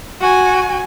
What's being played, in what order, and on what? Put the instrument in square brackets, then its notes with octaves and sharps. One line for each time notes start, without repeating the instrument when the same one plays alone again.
[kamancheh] F#4 G#5